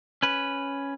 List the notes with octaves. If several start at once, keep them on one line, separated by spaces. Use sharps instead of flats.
C#4 B4